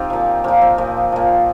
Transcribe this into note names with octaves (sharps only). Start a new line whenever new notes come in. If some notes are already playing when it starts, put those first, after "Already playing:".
Already playing: C4 D#4 F4 G4
A#2 F3
A#2 F3 A#3
C4
A#2 F3
A#2 F3